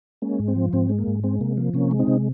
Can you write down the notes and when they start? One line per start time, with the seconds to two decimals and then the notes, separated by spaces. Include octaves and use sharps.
0.22 G#3 A#3 C#4
0.39 G#2
0.48 C4
0.56 F3
0.73 G#2 C4
0.89 G#3
0.99 A#3
1.07 G#2
1.24 G#3 C4
1.41 C3 A#3
1.57 F3 A#3
1.74 C3 A#3 C#4
1.91 G#3
1.99 C4 D#4
2.07 C3